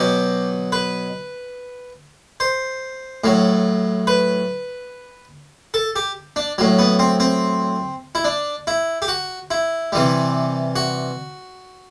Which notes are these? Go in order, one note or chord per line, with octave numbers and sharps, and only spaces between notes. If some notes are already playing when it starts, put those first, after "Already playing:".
Already playing: B2 F#3 G4
B4
C5
A2 F#3
B4
A4
G4
D4
A2 F#3
B3
C4
C4
E4
D4
E4
G4
F#4
E4
C3 E3 G3
F#4